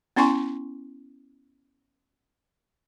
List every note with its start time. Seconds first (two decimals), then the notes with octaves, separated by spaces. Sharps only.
0.16 B3 C#4 E4 G#5 C6 C#6